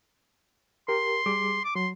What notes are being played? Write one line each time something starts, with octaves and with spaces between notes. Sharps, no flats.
G4 A#4 C6
G3 G#4 D6
D6
F#3 C6